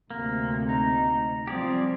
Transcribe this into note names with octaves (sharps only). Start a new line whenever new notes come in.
D2 C3 A#3
D#4 A#5
F3 G3 C4 G4 G#4 D5